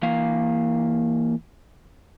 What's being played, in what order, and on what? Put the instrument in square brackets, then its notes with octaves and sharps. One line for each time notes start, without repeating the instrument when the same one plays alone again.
[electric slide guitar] E3 A#3 F5